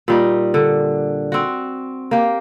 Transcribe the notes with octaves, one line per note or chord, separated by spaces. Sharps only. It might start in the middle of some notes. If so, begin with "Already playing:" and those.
A#2 G3 D#4
D3
C4 F#4
A#3 G4